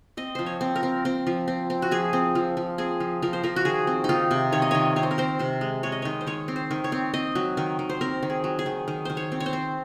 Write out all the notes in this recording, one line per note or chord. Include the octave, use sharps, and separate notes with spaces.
C4 D#5
F3 C5
C#5
C4
A#4
C4
C4
F3
C4
C4
F#4
F3 G#4
C4
F3
F3
C4 G#4
F3
F3 A#4
C5
F3 A#4
F#4
D#3 G#4
C4
D#4
D#3 F4
C3
D#3 C#5
D#5
D#3 C#5
C4 C#5
C5
A#4
C4 C5
C3 C5
G#3
G#3 C#5
D#5
D#3 C#5
C5
D#3 C#5
C4
C5
D#3
C#5
C4
C4 D#5
F#3
D#3
D#3
C5
C4 A#4
D#3
G#4
F#3
G#4
D#3
D#3
D#3 C5
C#5
C4
C#5
C5
C4